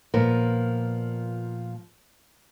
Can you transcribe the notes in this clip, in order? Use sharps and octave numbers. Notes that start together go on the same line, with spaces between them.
A#2 F3 B3 A#4